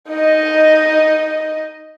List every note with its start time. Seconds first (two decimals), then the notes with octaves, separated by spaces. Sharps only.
0.10 D#4 D#5